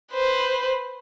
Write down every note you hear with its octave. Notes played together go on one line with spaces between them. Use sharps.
B4 C5